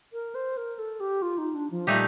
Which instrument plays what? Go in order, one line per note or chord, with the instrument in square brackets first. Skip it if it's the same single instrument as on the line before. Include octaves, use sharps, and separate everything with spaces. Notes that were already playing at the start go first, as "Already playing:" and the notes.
[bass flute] A#4
C5
A#4
A4
G4
F4
D#4
D4
F3
[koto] A#2 A3 D#4 G4 [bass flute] G3